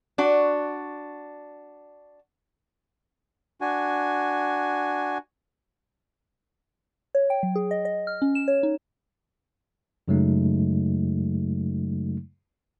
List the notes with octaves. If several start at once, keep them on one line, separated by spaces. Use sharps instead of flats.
D4 F#4
D4 F#4 G#5
C#5
G5
F#3
G#4
D#5
D#5
F6
C#4
E7
C#5
D#4
F#2 C#3 F#3 G#3 A3 D#4